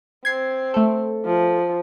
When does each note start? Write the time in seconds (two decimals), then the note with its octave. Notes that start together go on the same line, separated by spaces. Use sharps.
0.25 C4 G#6 C7
0.74 A3 A4
1.25 F3